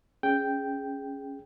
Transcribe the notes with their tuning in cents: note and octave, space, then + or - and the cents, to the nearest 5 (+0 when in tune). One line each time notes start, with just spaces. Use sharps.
C#4 +0 G#4 +0 G5 +0